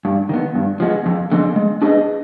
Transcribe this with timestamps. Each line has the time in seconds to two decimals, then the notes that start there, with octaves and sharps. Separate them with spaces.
0.05 G2
0.29 D#3 B3
0.55 G2
0.80 F3 G#3 B3
1.06 F2
1.32 D3 F3 G#3 C4
1.56 G#3
1.82 D4 G#4 B4 D#5